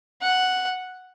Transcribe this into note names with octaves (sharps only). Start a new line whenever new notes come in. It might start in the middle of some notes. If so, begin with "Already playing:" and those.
F#5